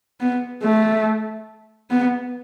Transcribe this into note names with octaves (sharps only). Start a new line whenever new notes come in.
B3
A3
B3